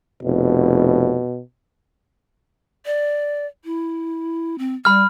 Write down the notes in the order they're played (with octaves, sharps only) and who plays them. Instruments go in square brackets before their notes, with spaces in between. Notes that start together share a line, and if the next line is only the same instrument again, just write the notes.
[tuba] F1 [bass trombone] B2
[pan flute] D5
E4
C4
[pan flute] G3 [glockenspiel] B5 F6